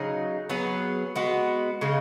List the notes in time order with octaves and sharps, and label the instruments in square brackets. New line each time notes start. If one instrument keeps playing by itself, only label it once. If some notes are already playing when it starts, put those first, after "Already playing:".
Already playing: [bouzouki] C#3 F#3 D#4 G#4
F#3 B3 G#4
G#3 B3 F#4
C#3 G#3 D#4